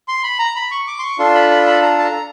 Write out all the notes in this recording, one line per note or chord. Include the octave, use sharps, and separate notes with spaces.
C6
B5
A#5
B5
C#6
D6
C6
C#6
D4 F4 A4 C6
B5
B5
B5
A#5
A5
A#5